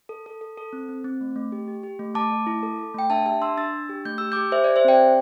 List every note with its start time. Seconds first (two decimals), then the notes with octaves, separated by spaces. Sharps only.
0.09 A4
0.26 A4
0.41 A4
0.58 A4
0.73 C4
0.89 C4
1.04 C4
1.21 A3
1.36 A3
1.52 G4
1.68 G4
1.83 G4
1.99 A3
2.15 A3 A5 D6
2.32 A3
2.47 E4
2.63 A4
2.79 A4
2.94 A3 G5
3.10 D4 E5 A5
3.26 G4 E5 A5
3.41 D4 C6 E6
3.57 D4 E6 A6
3.73 D4
3.89 G4
4.05 A3 G6
4.18 G4 E6
4.32 G4 D6 G6
4.52 G4 C5 E5
4.64 G4 D5
4.76 C5 E5
4.84 C4 D5 G5
5.00 G4